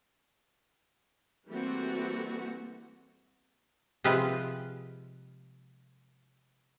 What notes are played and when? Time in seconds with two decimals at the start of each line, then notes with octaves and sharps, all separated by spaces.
1.48 E3 G3 A3 A#3 C4 F#4
4.04 C3 F3 G#3 F4 G4 B4